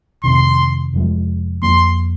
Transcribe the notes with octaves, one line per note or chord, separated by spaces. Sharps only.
F2 C3 D#3 C6
F1 F2 F3 G#3
F2 F3 A#3 C6